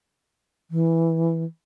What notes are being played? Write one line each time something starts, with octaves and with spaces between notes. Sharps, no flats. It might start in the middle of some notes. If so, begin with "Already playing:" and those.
E3